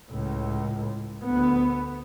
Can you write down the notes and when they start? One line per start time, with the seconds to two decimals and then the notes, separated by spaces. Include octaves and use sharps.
0.10 C#2 A2
1.23 D2 B3